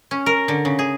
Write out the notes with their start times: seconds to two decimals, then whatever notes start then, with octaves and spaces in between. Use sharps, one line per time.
0.11 C#4
0.26 A#4
0.48 D3
0.65 C#3
0.79 G#4